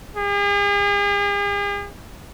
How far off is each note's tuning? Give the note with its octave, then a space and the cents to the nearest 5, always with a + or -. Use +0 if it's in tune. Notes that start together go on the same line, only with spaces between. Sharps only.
G#4 -45